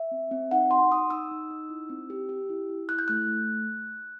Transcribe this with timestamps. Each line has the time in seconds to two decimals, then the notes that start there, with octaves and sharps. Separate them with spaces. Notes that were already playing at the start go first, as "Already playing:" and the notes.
Already playing: E5
0.11 C4
0.31 C4
0.51 D#4 F#5
0.71 F#4 C6
0.92 D#4 D#6
1.10 D#4 E6
1.31 D#4
1.51 D#4
1.70 E4
1.89 C4
2.10 G4
2.29 G4
2.49 E4
2.69 E4
2.89 E4 F#6
2.99 G6
3.08 A3 F#6
3.28 A3